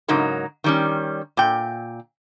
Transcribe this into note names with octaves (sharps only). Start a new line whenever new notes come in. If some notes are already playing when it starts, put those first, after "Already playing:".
G#2 C#3 F#3 D#4 A#4
D#3 G3 C#4
A#2 G5